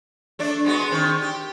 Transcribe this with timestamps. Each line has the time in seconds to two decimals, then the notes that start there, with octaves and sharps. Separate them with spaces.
0.39 A3 D4 D5
0.65 G#3 B3 F#4
0.90 D#3 C4 D4
1.22 G4